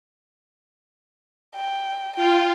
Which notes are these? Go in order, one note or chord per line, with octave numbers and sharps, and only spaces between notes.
G5
F4 G5